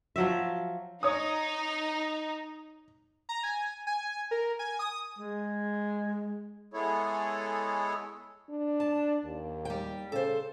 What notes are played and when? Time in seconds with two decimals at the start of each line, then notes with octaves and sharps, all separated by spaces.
0.16 F3 F#3 E5
1.03 D#4 C#5 D#6
3.29 A#5
3.43 G#5
3.87 G#5
4.31 A#4
4.59 G#5
4.79 D#6
5.19 G#3
6.74 G#3 B3 E4 G#4 A4 C#5
8.49 D4
8.80 A5
9.25 D#2
9.65 G3 G5
10.12 C#3 A4 C5